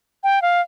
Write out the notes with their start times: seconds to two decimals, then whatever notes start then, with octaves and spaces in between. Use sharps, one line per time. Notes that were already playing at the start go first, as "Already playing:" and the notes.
0.24 G5
0.42 F5